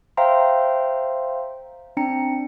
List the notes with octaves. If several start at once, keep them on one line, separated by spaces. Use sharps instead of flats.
C5 E5 F5 G5 A#5 C6
C4 D4 G5 A#5 C#7